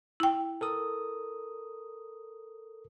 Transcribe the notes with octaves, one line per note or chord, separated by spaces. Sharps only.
E4 G5
A4 A#4 D#6